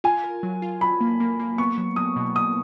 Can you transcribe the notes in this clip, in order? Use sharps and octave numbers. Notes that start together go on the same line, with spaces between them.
F4 G#5
A#4
F#3
F4
F#3 B5
A#3
A#3
A#3
B3 C#6
F#3
F#3 D#6
B2
B2 D#6